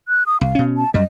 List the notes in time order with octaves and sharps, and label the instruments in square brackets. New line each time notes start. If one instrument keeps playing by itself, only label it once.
[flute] F#6
D#6
[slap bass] C2 [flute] F5
[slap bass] B2 C#4
[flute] A5
[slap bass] F#2 G3 [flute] D#5